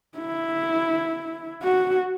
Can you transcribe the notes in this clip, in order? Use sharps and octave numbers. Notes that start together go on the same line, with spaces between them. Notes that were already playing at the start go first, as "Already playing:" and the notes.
E4
F#4